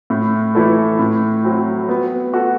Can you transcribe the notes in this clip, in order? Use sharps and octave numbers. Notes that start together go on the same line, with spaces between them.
A2
E3 A3 E4 A4
A2
F#3 C4
B3
F#4 A4